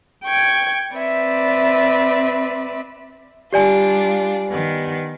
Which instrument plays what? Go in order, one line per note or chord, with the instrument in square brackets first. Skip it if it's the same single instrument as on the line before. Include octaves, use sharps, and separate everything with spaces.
[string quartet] G5 C#6 G#6
C4 B4 D5 E5
[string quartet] G3 D4 F4 [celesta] G4 D5 G#5
[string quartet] D#3 B3